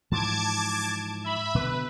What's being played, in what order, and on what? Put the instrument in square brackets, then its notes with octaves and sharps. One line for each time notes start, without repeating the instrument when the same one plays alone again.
[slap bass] G#2 E3 F3 [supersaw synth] A5 D6 G#6
[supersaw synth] E5 B5
[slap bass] B2 D3 [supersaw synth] B4